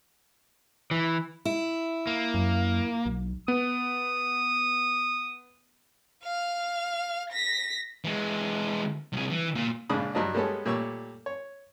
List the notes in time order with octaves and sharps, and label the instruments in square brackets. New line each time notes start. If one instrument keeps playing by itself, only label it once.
[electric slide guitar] E3
[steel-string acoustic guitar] E4
[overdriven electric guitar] A#3
[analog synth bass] F#2
B1
[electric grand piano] B3 [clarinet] D#6
[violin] F5 F6
A#6 B6
[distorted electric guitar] E3 G#3
C2 G#4
E3
A#2
[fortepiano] A#1 G#2 C#3 D4 B5 D#6
G2 F#3 D4 D#5
G3 G#3 B3 C#4 A4
A#2 G3 A3 C#5 C#6 E6
C#5